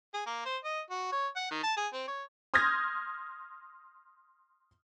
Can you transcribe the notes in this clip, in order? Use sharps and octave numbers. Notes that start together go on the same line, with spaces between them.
G#4
A#3
C5
D#5
F#4
C#5
F#5
D#3
A5
G#4
C4
C#5
C6 D#6 F6 G6 G#6 A#6